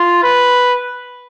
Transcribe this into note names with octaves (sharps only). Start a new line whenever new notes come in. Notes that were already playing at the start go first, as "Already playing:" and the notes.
Already playing: F4
B4